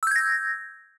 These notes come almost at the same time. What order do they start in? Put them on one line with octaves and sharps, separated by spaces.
E6 G6 G#6 A#6